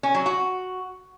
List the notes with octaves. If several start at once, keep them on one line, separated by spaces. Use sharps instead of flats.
C#4
F#3
F#4